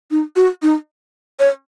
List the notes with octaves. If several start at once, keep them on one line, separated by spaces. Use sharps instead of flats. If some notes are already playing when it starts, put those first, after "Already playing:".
D#4
F#4
D#4
C#5